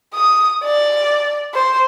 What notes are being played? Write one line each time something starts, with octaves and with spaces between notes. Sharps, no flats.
D#6
D5
C5